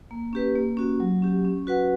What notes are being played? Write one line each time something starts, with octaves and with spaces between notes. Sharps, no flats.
A#3
C#4 G4 B4
A#3
C#4 F#4
F#3
C#4 G4
C#4
F#4 B4 F#5